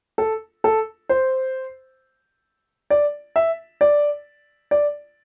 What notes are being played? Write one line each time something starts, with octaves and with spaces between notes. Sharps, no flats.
A4
A4
C5
D5
E5
D5
D5